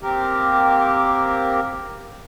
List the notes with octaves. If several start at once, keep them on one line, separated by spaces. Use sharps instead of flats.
A#3 C4 G4 A#4